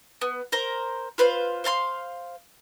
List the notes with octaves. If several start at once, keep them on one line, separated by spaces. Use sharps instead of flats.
B3
A#4 C5 A#5
F4 B4 C5 F5
C5 F5 A5 C6